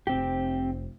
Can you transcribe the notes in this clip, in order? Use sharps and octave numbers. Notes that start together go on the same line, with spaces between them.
F1 C4 G4